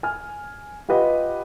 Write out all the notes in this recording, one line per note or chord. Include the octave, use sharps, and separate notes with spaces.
G#5 F6
F4 G4 B4 D#5 F#5